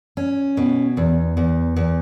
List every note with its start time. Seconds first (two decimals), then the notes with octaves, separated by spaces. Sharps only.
0.17 C#4
0.57 B2
0.97 E2
1.37 E2
1.76 E2